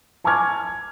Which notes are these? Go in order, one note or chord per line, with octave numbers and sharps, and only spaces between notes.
G#5 A5 C#6 D6 F6 G#6